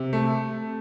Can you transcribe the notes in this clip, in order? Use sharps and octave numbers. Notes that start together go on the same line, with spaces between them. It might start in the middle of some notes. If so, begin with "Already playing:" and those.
Already playing: C3
A3